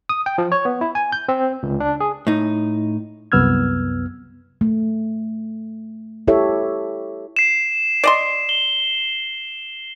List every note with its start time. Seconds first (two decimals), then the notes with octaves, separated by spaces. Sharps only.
0.09 D#6
0.26 G5
0.38 F3
0.52 C#5
0.65 B3
0.81 E4
0.95 G#5
1.12 G6
1.29 C4
1.63 C#2
1.80 D4
2.00 G#4
2.27 A2 D#4
3.32 C2 F#2 B3 E6 F6 G#6
4.61 A3
6.27 E4 G4 A4 C#5 E5
7.36 C7 E7
8.04 D5 D#5 C6
8.49 G7